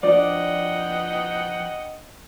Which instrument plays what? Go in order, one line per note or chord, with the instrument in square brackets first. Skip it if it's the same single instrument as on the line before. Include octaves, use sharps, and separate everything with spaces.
[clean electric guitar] F3 [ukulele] D4 D5 [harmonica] D#5 F#5 G5